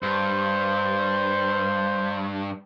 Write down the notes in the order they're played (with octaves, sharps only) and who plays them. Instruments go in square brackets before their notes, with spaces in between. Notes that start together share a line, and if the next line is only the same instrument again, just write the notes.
[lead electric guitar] G2 [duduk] C5